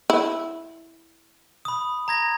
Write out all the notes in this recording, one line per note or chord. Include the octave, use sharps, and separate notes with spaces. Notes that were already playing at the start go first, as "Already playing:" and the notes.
E4
B5 D#6
A#5 G#6 A#6